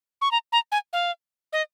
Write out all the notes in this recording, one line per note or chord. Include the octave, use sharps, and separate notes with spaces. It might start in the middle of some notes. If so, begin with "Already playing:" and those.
C#6
A#5
A#5
G#5
F5
D#5